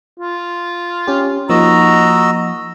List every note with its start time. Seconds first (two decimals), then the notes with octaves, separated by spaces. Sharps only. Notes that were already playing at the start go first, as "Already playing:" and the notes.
0.20 F4
1.07 C#4 G4
1.49 F3 A#3 D#4 F#4 D#5 A#5 E6